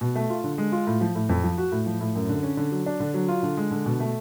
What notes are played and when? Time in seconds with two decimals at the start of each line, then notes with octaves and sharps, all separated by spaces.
0.01 B2
0.15 A3
0.30 F4
0.44 D3
0.58 G#3
0.72 F4
0.87 A2
1.01 F3
1.15 A2
1.29 F2
1.44 F3
1.58 F#4
1.72 A2
1.86 F3
2.01 A2
2.15 F#2
2.29 D3
2.43 C#4
2.57 D3
2.72 F#3
2.86 D4
3.00 D3
3.14 F#3
3.28 F4
3.43 D3
3.57 G#3
3.71 D3
3.86 B2
4.00 A3